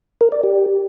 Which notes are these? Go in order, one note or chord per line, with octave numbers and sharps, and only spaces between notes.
A#4
D5
G4